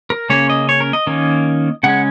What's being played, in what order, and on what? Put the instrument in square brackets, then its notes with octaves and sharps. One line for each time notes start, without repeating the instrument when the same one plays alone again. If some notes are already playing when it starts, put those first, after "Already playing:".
[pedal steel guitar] A#4
C#3 A#3 C#4 C#5
D#5
C#5
A#4
D#5
D#3 A#3 C#4
C#3 G#3 C#4 F#5